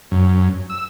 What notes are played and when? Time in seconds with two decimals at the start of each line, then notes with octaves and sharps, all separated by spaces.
0.11 F#2
0.70 E6